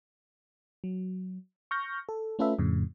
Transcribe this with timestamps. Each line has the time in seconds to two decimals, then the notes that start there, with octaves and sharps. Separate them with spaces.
0.84 F#3
1.71 C#6 F6 G6 A#6
2.09 A4
2.39 A3 C#4 F4 A4 B4 E5
2.59 F2 A2 C#3